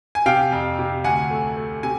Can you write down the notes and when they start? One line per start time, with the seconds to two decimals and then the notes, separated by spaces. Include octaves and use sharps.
0.15 G#5
0.26 C3 F5 G5
0.52 F2
0.79 C3
1.04 D2 F#5 G#5
1.31 A3
1.57 A3
1.83 C3 G#5